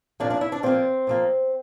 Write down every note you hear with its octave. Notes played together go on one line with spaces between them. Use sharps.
A#2 F3 A#3 D4 D5
D4 D5
E4 E5
D4 D5
A#2 F3 A#3 C4 C5
A#2 F3 A#3